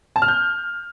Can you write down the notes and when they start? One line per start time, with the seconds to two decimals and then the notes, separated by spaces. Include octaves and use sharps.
0.16 A5
0.22 F6
0.28 G6